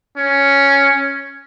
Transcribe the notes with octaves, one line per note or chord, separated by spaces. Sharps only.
C#4